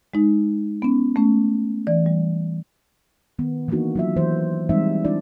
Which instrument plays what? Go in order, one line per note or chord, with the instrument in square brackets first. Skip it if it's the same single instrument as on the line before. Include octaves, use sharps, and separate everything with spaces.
[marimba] G#3 D#4
B3 C#4
A3 C#4
E3 D5
G3
[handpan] D#3 B3
E3 A#3 B3 D4 D#4 F#4
F#3 F4 E5
E3 C5
E3 G3 G#3 C4 D#4 E5
D4 E4 D5